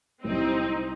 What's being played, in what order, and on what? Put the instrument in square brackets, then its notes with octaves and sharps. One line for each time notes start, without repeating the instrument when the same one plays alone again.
[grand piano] C2 [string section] C4 D#4